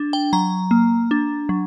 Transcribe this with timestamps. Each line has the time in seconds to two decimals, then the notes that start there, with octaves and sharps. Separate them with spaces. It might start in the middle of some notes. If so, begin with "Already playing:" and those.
Already playing: D4
0.13 G5
0.33 F#3 A#5
0.71 A#3
1.11 D4
1.49 F#3